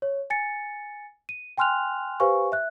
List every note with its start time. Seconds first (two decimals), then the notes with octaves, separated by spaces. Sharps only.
0.02 C#5
0.30 G#5 A6 C#7
1.29 D#7
1.58 G5 G#5 C6 F6 F#6 F7
2.20 G4 B4 C5 F5 G#5 C#6
2.52 E5 F#6